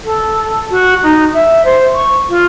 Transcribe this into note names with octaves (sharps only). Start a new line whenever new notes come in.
A4
F#4
D#4
E5
C5
C#6
F4